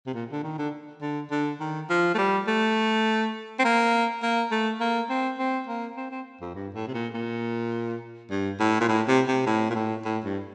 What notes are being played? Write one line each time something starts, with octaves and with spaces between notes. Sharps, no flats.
C3
A#2
D3
D#3
D3
D3
D3
D#3
F3
A3
G3
A3
C4
A#3
A#3
A3
A#3
C4
C4
A#3
C4
C4
F2
G2
A2
C3
A#2
A#2
G2
A2
A#2
A2
C3
C3
A2
A#2
A2
A2
G2